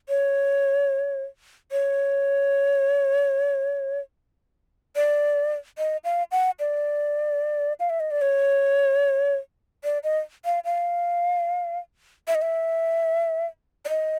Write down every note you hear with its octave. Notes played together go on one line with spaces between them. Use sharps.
C#5
C#5
D5
D#5
F5
F#5
D5
F5
E5
D#5
D5
C#5
D5
D#5
F5
F5
E5
D#5
E5
D5
D#5